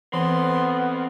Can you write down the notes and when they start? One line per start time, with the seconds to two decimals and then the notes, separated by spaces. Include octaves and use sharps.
0.13 E3 B3 C4 A4 C6